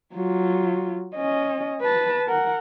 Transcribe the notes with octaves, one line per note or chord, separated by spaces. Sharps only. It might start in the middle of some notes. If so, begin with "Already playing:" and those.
F#3 F4
C#4 D#5
B4 A5
A#4 F#5